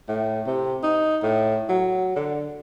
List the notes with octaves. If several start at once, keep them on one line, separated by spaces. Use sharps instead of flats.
A2
C3
D#4
A2
F#3
D3